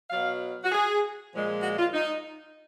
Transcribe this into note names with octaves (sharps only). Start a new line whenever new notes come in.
B2 F#3 F5
F#4
G#4
A#2 F3 G#3
F#4
F4
D#4